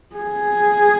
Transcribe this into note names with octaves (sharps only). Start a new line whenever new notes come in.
G#4